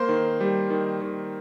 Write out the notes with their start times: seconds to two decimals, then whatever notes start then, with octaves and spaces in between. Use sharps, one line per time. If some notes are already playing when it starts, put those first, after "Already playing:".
Already playing: A#3 C5 C6
0.09 D#3
0.40 G3
0.70 D#3
1.01 D#3